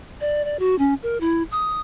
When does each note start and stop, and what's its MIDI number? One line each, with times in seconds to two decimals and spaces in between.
0.21 0.45 74
0.45 0.59 74
0.59 0.78 66
0.78 0.94 61
1.03 1.20 70
1.20 1.43 64
1.51 1.80 87